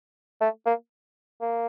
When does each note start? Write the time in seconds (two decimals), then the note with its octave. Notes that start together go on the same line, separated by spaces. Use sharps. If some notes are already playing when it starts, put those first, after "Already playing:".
0.41 A3
0.66 A#3
1.41 A#3